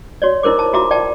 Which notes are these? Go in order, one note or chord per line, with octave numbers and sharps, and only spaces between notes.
F#4 C#5 D5
D#4 E4 A#4 C5 D6
A5
F4 F#4 E5 A#5 D6
D5 G5 A5